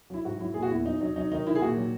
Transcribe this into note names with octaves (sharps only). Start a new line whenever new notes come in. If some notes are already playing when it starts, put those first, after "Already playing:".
F#3 E4
G#2 F#4
F#3 E4
A#2 G#4
F#4
E2 E4
F#3 D#4
F#3 D#4
F#3 D#4
D#3 D#4
D#3 E4
G#4
A#2 F#4
F#3